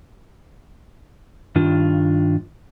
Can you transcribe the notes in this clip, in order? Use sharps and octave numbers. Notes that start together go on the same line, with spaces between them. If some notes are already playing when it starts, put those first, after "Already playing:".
G2 D#3 D4 F4